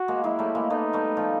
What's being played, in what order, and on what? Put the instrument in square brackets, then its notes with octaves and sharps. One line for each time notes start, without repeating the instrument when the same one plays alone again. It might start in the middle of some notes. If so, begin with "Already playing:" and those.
Already playing: [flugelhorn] F#4
[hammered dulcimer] G#3 A#3
[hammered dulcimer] F#3 G#3 [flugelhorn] E4
[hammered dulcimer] G3 A3
G#3 A#3
[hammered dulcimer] A3 B3 [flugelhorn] D#4
[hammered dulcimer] G3 A3
F3 G3